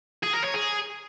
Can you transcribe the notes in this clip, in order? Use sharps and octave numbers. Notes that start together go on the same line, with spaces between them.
G#4
A#4
C#5
G#4